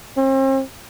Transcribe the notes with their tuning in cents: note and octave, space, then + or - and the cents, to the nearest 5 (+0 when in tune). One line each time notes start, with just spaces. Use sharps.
C4 +40